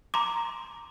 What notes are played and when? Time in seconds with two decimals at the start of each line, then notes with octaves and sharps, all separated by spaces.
0.14 A#5 C6 D6